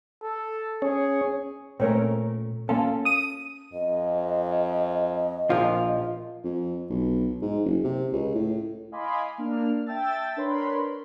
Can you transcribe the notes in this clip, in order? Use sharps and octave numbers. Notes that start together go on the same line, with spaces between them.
A4
C#4 G#4 C#5
A#2 A3 C4 C#4 A#4 C#5
A#3 C#4 F4 A4
D#6 D#7
F2 D#5
A#1 F3 F4
F2
B1
G#2
F#1
C3
C#2
A2
D#5 F5 G#5 B5 C6 D6
A#3 D4 F6
E5 G5 A5 E6 A6
D4 A#4 B4 C#5 B5 C6